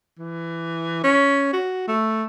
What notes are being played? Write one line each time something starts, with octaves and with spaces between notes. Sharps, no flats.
E3
C#4
F#4
A3